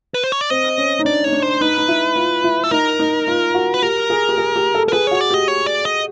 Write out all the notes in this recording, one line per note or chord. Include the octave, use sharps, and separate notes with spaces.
B4
C5
C#5
D5
C4 D#5
C#4
D#4
D4 D5
D#4 C#5
D4
C5
D#4 B4
D#4
E4
F4
E4
A4
D#4 A#4
D#4
F4
F#4
B4
G4 A#4
G#4
G4
G#4
G4
A4
A#4
G#4 B4
F#4 C#5
D5
G4 D#5
C#5
D5
D#5